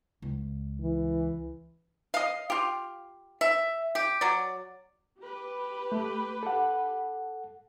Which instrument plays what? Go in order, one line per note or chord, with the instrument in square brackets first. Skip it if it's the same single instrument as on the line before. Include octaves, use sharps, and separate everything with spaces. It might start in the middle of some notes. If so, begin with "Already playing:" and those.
[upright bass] C#2
[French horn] E3
[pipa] D#5 F5
F4 G4
E5
G4
F#3 D5
[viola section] G4 B4
[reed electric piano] A3
A4 F#5